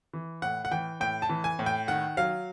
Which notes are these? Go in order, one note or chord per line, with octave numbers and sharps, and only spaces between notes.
E3
A2 F#5
F#5
E3 G5
A2 G5
A5
E3
G#5
A2
G5
D#3 F#5
F#3 F5